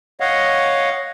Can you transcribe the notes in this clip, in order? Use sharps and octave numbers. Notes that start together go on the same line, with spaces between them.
C#5 D#5 F5 F#5